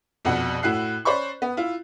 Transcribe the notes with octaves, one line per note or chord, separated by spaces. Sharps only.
A#1 F2 B2 F#5
A2 E4 F#4 F#6 C7
C#4 C5 D5 B5 C#6
B3
E4 F4